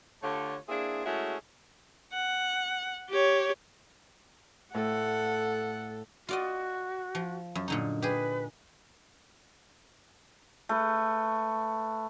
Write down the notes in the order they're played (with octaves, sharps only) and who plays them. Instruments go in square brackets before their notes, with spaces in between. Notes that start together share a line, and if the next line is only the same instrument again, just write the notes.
[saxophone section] D3 A3 F4 G4 C#5
A#3 C4 D4 E4 G#4
G#3 A3 C#4 E4 F#4 G#4
[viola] F#5
G4 C#5
[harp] A2 [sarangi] A4 [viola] F#5
[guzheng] F4 D5 D#5 [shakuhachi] F#4
[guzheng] F3
F#2
A#2 D3 D#4
[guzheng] G4 G#4 [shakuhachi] B4
[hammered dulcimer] A3 B4